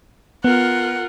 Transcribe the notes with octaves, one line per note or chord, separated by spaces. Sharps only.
B3 F4 A#4 F#5